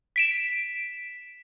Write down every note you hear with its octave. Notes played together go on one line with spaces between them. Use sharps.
B6 D7 E7